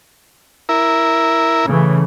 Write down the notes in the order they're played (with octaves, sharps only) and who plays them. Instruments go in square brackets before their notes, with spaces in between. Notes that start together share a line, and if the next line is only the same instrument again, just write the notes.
[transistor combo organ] E4 A#4
[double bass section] C#3 E3 A3